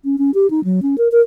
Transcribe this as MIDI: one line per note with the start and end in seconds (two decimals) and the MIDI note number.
0.05 0.16 61
0.18 0.31 61
0.34 0.49 67
0.50 0.63 63
0.64 0.80 54
0.82 0.96 61
0.98 1.08 70
1.12 1.20 70